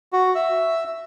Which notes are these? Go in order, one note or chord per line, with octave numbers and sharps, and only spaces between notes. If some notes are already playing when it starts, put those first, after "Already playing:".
F#4
E5